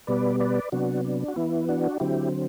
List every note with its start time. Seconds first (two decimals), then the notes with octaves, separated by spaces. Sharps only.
0.07 B2 G3 B3 B4 D5
0.40 B4 D5
0.72 C3 F#3 B3 D4 F#4
1.05 D4
1.28 F#4
1.36 E3 B3 E4
1.69 D4 F#4
2.00 D3 F#3 C4 E4 G4